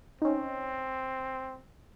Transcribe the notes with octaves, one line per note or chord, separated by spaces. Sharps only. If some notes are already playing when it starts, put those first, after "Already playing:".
C4 C#4 D#4